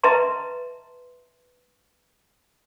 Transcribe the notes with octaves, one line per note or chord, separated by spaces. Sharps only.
B4 D#5 E5 A5 A#5 C6